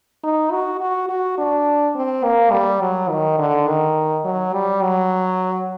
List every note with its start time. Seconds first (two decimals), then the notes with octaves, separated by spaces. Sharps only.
0.23 D#4
0.52 F#4
0.81 F#4
1.09 F#4
1.38 D4
1.95 C4
2.23 A#3
2.52 G3
2.81 F#3
3.09 D#3
3.38 D3
3.67 D#3
4.24 F#3
4.53 G3
4.82 F#3